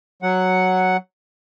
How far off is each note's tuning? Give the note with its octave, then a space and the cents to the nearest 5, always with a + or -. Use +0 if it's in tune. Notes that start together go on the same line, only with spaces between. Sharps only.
F#3 +0 F#5 +0